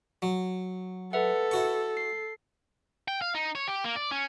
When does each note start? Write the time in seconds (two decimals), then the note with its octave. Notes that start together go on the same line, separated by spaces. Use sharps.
0.22 F#3
1.13 A4 B4 E5 F#5
1.51 E4 F#4 C#6
1.97 C7
3.08 G5
3.22 F5
3.35 D#4
3.55 C#5
3.68 G4
3.84 A#3
3.96 D5
4.11 C#4